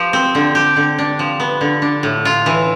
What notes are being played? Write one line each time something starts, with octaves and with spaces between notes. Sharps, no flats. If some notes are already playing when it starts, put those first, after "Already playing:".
Already playing: F3 G4
C4
D3
G4
D3
D4
F3
B3
D3
D4
A2
F4
E3